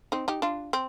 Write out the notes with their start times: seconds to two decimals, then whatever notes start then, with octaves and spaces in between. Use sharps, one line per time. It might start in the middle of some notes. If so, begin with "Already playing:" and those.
0.12 C4 D#4
0.28 D#4 G4
0.42 D4 F4
0.73 C4